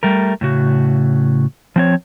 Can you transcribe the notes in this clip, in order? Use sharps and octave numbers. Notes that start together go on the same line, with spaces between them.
G3 A3 A#4
A2 C#3 F#4
F3 C4 C#5